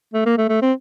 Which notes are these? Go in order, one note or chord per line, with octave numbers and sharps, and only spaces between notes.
A3
A#3
A3
A3
C4